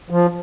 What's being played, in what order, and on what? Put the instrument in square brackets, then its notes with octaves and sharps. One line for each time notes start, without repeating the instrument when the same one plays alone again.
[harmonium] F3